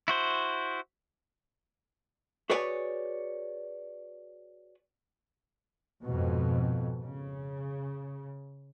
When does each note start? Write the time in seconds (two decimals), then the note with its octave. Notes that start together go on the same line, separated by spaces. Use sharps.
0.08 E4 F#4 C5
2.50 F#4 G#4 B4 C#5 D5 G#5
6.03 F2 G#2 B2
7.04 C#3